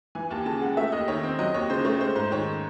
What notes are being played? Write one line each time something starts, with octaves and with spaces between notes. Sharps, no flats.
E3 G#5
D#2 A5
C#3 A5
G#3 F#5
A3 E5
D#2 D#5
D#3 C#5
C4
F#3 D#5
D#2 C#5
C#3 C5
A3 C#5
G#3 C5
G#2 C5
D#3 C#5